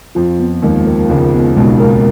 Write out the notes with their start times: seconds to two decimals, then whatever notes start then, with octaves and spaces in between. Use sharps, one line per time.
0.15 F2 F3 F4
0.40 B3
0.62 D#2 D#3 G#3
0.87 A#4
1.09 C#2 C#3 F4
1.34 B3
1.57 B1 B2 G#3
1.80 A#4